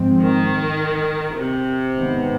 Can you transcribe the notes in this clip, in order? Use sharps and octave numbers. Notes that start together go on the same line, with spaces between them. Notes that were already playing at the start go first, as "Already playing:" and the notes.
Already playing: G#2 F3 G#3 C4
D#3
C3
G#2 D#3 B3